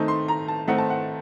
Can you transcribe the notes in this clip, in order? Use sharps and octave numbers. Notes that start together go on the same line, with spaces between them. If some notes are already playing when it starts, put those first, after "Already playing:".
Already playing: D#3 A3 C4 D#4 A5
C6
A#5
A5
D#3 A3 C4 D#4 F#5
A5
F#5